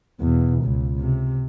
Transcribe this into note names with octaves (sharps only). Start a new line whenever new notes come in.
E2 B2
C#2
C3